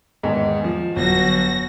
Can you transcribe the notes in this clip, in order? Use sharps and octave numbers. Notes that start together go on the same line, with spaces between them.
E2 G#2 D#3
F3
G1 F#3 F#4 A#6